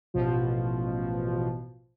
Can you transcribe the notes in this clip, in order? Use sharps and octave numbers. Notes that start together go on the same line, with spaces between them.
A1 B2 F3